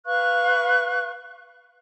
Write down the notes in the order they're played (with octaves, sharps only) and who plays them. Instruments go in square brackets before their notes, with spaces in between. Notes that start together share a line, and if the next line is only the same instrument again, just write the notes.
[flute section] B4 F5 C#6 F#6